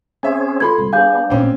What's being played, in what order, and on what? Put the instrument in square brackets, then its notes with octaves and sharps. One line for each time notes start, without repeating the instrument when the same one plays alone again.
[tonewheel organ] C4 C#4 G#4 [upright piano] E5 G#5
[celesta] F4 A4 G#6 [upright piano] B4 B5 C6
[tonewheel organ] C3 [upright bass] G3
[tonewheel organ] B3 D4 [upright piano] G#4 G#5 [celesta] F5 G6
[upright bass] A1 A#2 [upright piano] C4 C#4